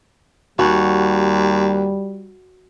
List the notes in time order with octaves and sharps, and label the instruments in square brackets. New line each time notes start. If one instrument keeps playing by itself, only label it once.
[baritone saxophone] D#2 [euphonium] G3 [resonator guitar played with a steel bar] F#4